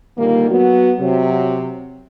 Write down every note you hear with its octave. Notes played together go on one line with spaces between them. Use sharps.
A#2 D3 D#3 G3 A#3
F#3 B3 F#4
C3 F#3